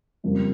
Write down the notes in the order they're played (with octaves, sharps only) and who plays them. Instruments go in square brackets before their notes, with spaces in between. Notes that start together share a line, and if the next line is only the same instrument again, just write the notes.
[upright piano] F2 C#3 G3 A#3